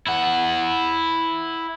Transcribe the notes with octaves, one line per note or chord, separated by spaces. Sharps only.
E4 F#5